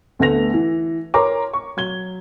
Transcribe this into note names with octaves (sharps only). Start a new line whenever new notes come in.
D2 D3 A3 B3 A#6 F7
E3
A#4 C#5 A#5 C6 D6
C#6
F#3 G#6 G7